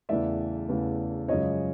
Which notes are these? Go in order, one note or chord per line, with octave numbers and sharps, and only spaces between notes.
E2 C#3 E3 A3 D5 E5
E2 C#3 E3 A3
F#2 C#3 F3 G#3 C#5 D#5